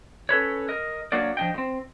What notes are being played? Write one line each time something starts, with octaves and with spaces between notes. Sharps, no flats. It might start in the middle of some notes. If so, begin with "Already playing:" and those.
C#4 A4 B4 C#5
A#4 D#5
F#3 A#3 D4 F#4 A#4 D5
F3 D4 D#5 G5
A2 C4